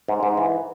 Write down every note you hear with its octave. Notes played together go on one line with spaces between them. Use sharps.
G#2
G#2
E3